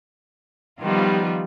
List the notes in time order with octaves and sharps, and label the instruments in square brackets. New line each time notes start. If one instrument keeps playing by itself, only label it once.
[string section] D#3 F3 G3 B3 F4